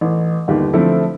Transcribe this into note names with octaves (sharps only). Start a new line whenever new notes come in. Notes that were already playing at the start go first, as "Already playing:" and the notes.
A1
G1 D#2 G4
D3 F3 A3 C4 E4